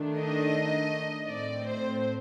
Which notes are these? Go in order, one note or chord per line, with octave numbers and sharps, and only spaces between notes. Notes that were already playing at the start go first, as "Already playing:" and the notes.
Already playing: D#3 A3 D4
D#5
A2 A3 C4 D5
C5